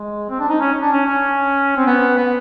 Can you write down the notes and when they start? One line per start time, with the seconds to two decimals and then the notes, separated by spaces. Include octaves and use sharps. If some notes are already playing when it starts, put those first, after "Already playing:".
Already playing: G#3
0.29 C4
0.40 D4
0.49 D#4
0.60 C#4
0.81 D4
0.92 C#4
1.06 C#4
1.76 C4
1.86 B3
2.17 B3